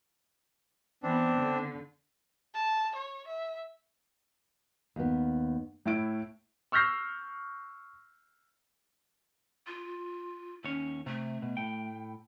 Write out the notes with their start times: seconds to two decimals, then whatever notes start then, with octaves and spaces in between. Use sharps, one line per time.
1.03 E3 B3 C4 D4
1.38 D3
2.55 A5
2.95 C#5
3.27 E5
4.96 D#2 B3
5.86 A2 A3 E4 D7
6.72 C#6 E6 F6 G6 A#6 C7
9.67 F4
10.64 D#2 C#4 C#5
11.06 C3 A3
11.42 B2
11.57 A2 G5